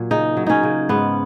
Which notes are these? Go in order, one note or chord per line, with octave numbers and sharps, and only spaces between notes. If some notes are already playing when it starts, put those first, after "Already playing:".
Already playing: A#2 F#3
C#3 D#4
F#3
C#4 D#4
C#3
G#2 B3